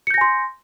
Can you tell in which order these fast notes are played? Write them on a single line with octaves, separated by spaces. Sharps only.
C#7 G6 A#6 G#5 C6